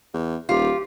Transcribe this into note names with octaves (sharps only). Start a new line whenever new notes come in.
E2
D#1 F4 G4